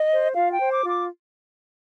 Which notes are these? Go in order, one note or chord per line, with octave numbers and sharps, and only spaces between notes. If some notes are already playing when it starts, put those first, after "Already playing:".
Already playing: D#5
C5
F4 F5
G5
C5
D6
F4
D6